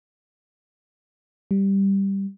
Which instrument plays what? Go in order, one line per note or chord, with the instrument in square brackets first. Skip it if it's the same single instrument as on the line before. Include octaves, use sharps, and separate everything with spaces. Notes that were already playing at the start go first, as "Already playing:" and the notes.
[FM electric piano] G3